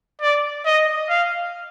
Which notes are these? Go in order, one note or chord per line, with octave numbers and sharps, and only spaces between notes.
D5
D#5
F5